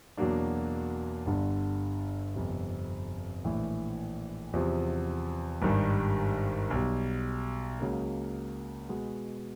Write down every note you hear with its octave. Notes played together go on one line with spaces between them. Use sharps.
E2 B2 F#3 A#3 D4
G1 G2 D3
G1 F2 C3
A#1 A2 E3
E2 C3 F3
G#1 G2 D#3 G3
B1 B2 G3
C#2 C#3 F#3 A#3
B2 G#3 B3